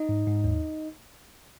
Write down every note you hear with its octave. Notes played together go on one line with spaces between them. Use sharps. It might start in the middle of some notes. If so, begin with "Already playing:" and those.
Already playing: D#4 D#5
G#2
G#2
D#2